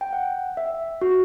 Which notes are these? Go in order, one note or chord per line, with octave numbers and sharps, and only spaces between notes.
G5
F#5
E5
F#4